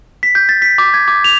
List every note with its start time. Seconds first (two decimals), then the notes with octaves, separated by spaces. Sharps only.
0.23 B6
0.35 G6
0.49 A6
0.62 B6
0.78 D6
0.94 G#6
1.08 D6
1.24 F7